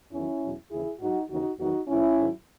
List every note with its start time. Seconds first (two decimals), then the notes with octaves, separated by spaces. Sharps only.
0.13 E2 D#3 F#3 C#4 E4
0.42 E2 B2 F#3
0.71 D#2 C#3 E3 E4 G#4
1.01 G#2 F#3 D#4 F#4
1.30 D#2 C#3 E3 D#4 F#4
1.59 E2 D#3 F#3 D#4 F#4
1.88 G#2 E3 C#4 E4
2.18 G#2 D#3 F#3